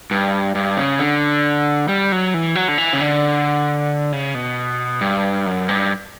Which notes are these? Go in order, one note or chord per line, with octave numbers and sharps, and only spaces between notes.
G2
G2
C#3
D3
G3
F#3
E3
F#3
D3
E3
C#3
D3
C#3
B2
G2
F#2
G2